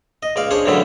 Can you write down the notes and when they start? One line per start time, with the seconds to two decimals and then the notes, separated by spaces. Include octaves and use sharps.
0.23 D#5
0.36 C#2 D5 F5
0.51 D4 G#4 C5 C#5
0.66 F#2 A2 D3 E3 F#3 A4